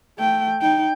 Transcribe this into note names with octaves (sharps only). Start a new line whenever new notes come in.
A3 G5
D#4 G5